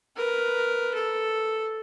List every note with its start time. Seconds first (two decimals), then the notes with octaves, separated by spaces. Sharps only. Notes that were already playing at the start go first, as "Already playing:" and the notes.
0.16 A#4 B4
0.94 A4